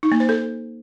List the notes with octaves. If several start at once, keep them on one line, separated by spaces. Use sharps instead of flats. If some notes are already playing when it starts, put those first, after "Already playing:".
D#4
A#3
C5
A4